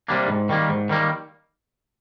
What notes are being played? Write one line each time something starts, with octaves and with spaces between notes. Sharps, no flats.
C3 G3 A#3 D4
G#2
D#3 G3 A#3
G#2
D#3 G3 A#3